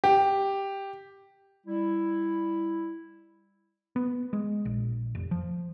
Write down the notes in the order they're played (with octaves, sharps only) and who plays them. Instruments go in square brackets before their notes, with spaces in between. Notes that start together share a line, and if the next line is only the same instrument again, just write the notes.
[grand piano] G4
[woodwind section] G3 E4
[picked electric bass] B3
G#3
A#1
F1
F3